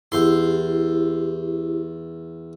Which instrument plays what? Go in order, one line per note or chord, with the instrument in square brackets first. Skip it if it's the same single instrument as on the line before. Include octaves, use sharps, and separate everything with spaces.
[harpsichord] E2 C6 [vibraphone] E4 G4